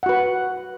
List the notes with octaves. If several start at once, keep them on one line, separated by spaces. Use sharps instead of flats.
F#4 B4 F#5